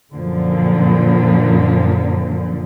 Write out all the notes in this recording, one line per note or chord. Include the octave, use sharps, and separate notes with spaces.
F#2 A#2 D3 F3